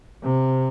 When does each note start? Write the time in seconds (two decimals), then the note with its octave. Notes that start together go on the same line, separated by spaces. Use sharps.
0.23 C3